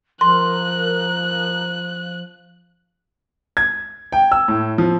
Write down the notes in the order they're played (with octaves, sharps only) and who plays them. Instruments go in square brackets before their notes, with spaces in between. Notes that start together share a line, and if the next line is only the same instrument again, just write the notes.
[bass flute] F3 [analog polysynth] A#4 [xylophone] C6 [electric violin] F#6
[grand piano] G#6
G5
E6
A2
F3